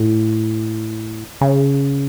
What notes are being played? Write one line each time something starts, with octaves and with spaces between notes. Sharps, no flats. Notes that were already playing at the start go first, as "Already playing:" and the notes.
Already playing: A2
C#3